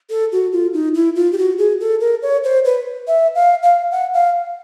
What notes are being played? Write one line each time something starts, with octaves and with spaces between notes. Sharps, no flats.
A4
F#4
F4
D#4
E4
F4
G4
F#4
G#4
A4
A#4
C#5
C5
B4
E5
F5
F5
F#5
F5